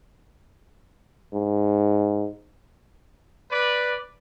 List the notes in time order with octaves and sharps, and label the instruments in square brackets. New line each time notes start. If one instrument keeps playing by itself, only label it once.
[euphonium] G#2
[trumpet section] B4 D5